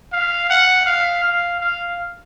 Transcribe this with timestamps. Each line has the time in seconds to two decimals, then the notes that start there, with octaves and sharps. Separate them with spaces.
0.13 F5
0.50 F#5
0.86 F5
1.24 F5
1.60 F5